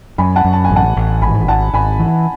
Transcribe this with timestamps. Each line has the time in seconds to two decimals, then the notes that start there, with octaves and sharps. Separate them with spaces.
0.18 F#2 G#5 B5
0.36 F#5 A5
0.45 F#2
0.53 A5
0.64 G#5
0.70 A1
0.76 F#5 A5
0.97 A1
1.22 G#1 G#5 B5
1.48 G#1 F#5 A5
1.74 G#1 G#5 B5
1.99 E3